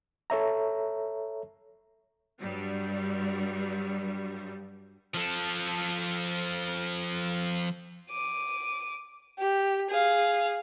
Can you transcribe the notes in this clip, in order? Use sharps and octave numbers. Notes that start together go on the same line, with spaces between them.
A4 C#5 E5 A#5
G2 F#3 G3
F3 A4
D6 D#7
G4
G#4 F5